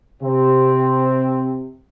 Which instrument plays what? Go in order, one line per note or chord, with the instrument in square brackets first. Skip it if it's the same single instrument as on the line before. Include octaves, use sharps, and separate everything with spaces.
[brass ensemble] C3 C4